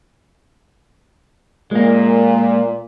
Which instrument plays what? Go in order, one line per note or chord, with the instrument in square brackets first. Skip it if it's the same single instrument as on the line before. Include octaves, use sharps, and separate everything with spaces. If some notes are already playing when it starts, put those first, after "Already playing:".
[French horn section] A#2 [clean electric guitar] G#3 A#3